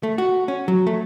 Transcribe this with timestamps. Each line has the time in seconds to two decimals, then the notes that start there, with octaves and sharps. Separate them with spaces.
0.03 A3
0.18 F#4
0.48 C#4
0.68 F#3
0.87 A3